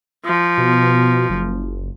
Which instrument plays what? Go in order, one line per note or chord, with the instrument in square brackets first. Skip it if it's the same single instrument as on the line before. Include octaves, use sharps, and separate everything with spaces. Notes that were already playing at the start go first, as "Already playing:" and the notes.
[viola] F3
[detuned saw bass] B2
F#1